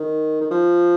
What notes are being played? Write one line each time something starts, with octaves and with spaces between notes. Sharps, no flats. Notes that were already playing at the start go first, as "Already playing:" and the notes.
Already playing: D#3
D#3
F3